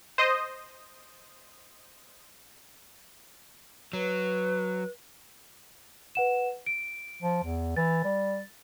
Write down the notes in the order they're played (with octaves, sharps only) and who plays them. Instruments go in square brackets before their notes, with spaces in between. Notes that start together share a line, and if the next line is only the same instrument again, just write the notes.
[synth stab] C5 D#5 D#6
[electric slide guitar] F#3 [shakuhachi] B4
[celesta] B4 F#5 E7
D7
[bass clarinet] F3
E2
[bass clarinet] E3 [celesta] A6
[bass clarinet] G3